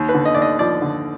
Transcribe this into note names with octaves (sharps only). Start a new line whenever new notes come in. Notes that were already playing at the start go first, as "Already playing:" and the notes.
Already playing: D#2
B4
D3
D#5
D#2 D5
D#5
F3 D5
D3